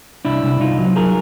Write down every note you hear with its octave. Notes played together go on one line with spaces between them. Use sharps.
C2 D4 E4
C2
C2 D#4 F4
F#3
G#4 A#4